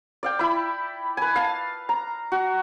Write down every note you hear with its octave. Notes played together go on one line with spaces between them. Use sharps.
D5 F5 G5
E4 B5
B4 G#5
F5 A5
A#5
F#4